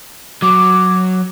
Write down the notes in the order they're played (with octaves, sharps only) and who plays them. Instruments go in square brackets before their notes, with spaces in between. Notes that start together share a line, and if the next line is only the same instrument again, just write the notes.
[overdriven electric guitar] F#3 [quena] D6